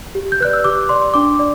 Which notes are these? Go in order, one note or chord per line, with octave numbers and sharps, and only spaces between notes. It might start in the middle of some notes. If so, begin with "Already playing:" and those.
G4
G6
B4 D5 F#6
E6
G4 D6
D5 C6
D4 D6
D5